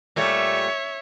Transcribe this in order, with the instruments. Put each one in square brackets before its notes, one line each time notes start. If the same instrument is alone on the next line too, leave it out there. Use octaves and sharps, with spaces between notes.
[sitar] A#2 G3 A3 [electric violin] C#5 E5